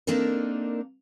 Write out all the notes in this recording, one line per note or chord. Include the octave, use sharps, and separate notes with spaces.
A#3 C4 D4 D#4 A4 A#4